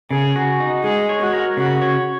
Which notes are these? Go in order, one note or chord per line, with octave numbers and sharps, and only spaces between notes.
C#3 G#4
F#4
D#4
G#3 G#4
C#5
F#4
A#4
C#3 F#4
C#5